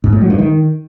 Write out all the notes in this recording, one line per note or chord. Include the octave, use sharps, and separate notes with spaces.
G#2
A2
F#3
G2
D#3